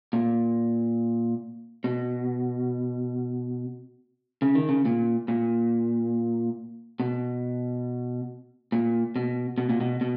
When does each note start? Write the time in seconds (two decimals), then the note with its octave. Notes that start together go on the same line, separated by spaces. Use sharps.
0.13 A#2
1.84 B2
4.42 C#3
4.55 D#3
4.69 C#3
4.85 A#2
5.28 A#2
7.00 B2
8.72 A#2
9.16 B2
9.58 B2
9.70 A#2
9.81 B2
10.01 B2